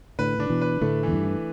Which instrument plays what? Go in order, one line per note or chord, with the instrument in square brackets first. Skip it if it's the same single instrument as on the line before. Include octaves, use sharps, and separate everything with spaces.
[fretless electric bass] A2 D3 [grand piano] B4
[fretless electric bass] D3 [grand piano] D4
[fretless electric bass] B2 E3
[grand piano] B4
[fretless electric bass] A2 D3 [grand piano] A3
[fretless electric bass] E2 [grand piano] E3
[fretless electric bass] G2
[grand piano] E3